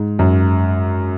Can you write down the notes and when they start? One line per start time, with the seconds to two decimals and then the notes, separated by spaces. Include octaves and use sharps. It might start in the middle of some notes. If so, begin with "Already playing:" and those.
Already playing: G#2
0.19 F#2